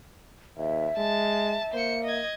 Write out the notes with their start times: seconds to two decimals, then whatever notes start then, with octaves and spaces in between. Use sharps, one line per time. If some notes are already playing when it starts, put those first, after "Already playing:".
0.57 D#2 E5
0.98 G#3 A5
1.74 A#3 C5 C#7
2.04 D#5 G#6